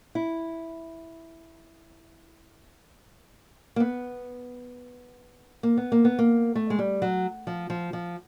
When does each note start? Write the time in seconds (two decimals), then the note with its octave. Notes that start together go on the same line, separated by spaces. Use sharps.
0.15 E4
3.76 A#3
3.80 B3
5.63 A#3
5.77 B3
5.92 A#3
6.05 B3
6.19 A#3
6.55 A3
6.70 G#3
6.79 G3
7.02 F#3
7.47 F3
7.70 F3
7.93 F3